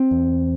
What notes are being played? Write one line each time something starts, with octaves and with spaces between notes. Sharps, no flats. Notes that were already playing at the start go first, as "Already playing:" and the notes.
Already playing: C4
E2